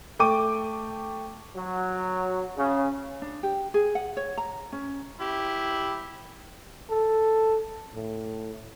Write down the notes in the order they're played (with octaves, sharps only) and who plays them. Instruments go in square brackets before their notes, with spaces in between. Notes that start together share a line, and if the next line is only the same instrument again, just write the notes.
[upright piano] A3 G5 C#6 D6 D#7
[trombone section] F#3
C#3
[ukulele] D4
G4
G#4
F#5
C#5
A#5
C#4
[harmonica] E4 G4
[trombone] A4
A2